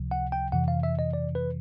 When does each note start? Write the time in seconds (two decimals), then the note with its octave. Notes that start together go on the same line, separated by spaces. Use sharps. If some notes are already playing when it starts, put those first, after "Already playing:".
Already playing: C#2 C3 F3
0.11 F#5
0.32 G5
0.52 F2 C3 E3 F#5
0.68 F5
0.83 E5
0.99 D#5
1.13 D5
1.35 B4